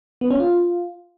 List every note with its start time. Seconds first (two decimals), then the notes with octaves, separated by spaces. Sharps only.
0.21 B3
0.31 C#4
0.40 F4